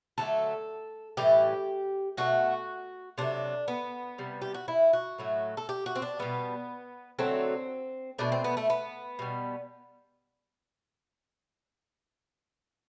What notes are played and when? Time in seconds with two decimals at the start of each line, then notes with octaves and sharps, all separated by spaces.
0.18 D3 F#3 A3 A4
1.17 A2 E3 G3 G4
2.17 B2 A3 F#4
3.18 C3 F#3 A3 D4
3.68 B3
4.18 C3 G3
4.42 G4
4.54 F#4
4.68 E4
4.93 F#4
5.19 A2 F#3 A3
5.57 A4
5.69 G4
5.86 F#4
5.95 C4
6.02 D4
6.19 B2 G3 B3
7.19 D3 F#3 A3 C4
8.19 B2 A3 D4
8.32 C4
8.44 B3
8.57 A3
8.70 B3
9.19 B2 G3